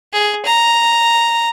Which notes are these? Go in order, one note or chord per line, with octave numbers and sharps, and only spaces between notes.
G#4
A#5